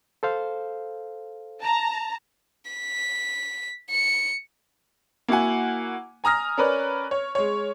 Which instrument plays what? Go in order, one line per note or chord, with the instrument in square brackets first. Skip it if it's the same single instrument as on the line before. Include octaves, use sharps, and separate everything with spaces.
[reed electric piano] A4 C5 F5
[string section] A5 A#5
[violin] B6
C#7
[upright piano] A#3 E4 F#4 F#5 G#5
G#5 A#5 D#6 F6 A#6
C#4 A#4 B4 D5
C#5
G#3 C#5